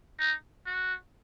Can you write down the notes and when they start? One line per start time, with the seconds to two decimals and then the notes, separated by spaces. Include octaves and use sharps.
0.19 D#4
0.66 F#4